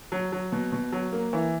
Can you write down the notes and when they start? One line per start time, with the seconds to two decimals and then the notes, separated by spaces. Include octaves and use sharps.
0.12 F#3
0.32 F#3
0.52 B2
0.72 B2
0.92 F#3
1.12 A#3
1.33 E3